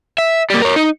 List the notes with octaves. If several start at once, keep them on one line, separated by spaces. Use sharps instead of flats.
E5
G3 A#3
A#4 C#5
D#4